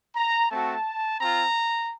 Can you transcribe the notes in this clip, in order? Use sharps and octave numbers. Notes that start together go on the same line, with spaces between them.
A#5
A3 C4 F#4 A5
C4 F4 A#5